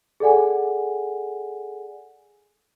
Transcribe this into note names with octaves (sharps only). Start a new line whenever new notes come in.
G#4 A4 D5 F#5 G#5